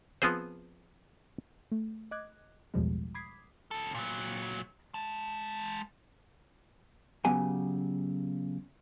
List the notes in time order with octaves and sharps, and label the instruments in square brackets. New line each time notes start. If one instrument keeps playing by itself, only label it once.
[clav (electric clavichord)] F3 B3 C4 G#4 C5
[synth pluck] A3
D#5 D6 F#6 G#6
A1 E2 B2 F3 G3 G#3
B5 D6 D#6 G#6 B6 C7
[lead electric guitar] C#3 A4
A#2 F#3
G#3 A5
[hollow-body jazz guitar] C#3 F#3 B3 G4 G#5